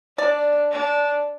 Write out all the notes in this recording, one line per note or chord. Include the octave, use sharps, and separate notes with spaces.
D4 D5
D4